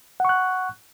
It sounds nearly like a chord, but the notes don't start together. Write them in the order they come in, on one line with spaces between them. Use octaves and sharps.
F#5 C#6 F#6